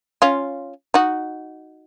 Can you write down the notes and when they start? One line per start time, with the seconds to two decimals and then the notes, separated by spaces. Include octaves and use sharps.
0.22 C#4 F4
0.94 D#4 F#4